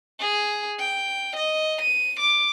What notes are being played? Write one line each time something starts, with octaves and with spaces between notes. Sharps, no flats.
G#4
G5
D#5
D#7
D6